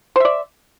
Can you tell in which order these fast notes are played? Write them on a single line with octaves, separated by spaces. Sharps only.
C5 E5 D5